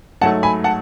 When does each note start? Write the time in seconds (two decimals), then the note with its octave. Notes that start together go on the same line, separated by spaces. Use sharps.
0.21 G#2 F#3 A3 F#5 A5
0.43 G#5 B5
0.64 F#5 A5